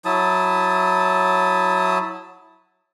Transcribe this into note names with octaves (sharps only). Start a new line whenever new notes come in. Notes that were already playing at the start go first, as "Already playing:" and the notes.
F#3 E4 A5 D#6